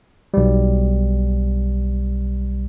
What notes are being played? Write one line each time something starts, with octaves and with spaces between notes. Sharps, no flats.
B1 G3